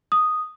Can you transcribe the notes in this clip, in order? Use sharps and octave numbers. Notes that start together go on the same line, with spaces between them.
D#6